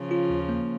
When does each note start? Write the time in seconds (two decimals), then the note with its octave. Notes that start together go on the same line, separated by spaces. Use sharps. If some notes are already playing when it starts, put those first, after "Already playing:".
Already playing: C#3 F3
0.11 F4
0.30 D#2
0.49 A#3